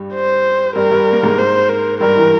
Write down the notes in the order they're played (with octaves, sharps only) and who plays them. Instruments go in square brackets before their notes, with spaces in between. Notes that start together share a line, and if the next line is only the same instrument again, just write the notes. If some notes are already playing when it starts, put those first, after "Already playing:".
Already playing: [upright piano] G2 G3
[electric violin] C5
[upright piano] G2 G3 [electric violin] A#4
[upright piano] G2 G3
A#3
G#2 G#3
[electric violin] C5
A#4
[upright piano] G2 G3 [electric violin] A#4
[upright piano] E3